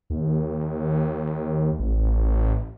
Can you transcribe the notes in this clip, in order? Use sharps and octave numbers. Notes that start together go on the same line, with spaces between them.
D#2
A1